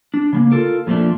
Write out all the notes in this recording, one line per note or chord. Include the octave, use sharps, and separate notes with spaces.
D4
C#3 G#3 A#3
F4 A4 A#4
F2 A#2 F3 A3 D4